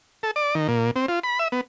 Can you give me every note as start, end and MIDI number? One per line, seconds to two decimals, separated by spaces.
0.23 0.31 69
0.36 0.55 74
0.55 0.67 51
0.68 0.91 46
0.96 1.06 60
1.08 1.19 65
1.24 1.39 83
1.39 1.48 76
1.52 1.61 59